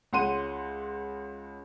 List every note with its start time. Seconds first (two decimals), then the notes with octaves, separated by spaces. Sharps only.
0.13 C#2 C#4 F#5 C6 D#7